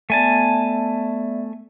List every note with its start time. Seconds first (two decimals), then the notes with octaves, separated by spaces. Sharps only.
0.10 A3 B3 D5 E5 G#5 A5